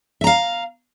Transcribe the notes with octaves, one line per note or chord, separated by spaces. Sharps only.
E5 F5 A#5